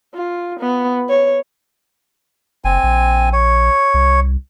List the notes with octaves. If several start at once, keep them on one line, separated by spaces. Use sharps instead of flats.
F4
B3
C#5
F#1 C4 G#5
A#1
C#5
C2